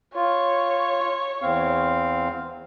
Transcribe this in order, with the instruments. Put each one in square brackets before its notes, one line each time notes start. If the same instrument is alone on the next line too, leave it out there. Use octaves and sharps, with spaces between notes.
[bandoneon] F4 [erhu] C#5
[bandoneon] E2 C4 F5